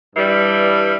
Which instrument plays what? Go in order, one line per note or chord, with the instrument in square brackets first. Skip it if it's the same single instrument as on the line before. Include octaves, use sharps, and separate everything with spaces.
[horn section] G2 E3 G3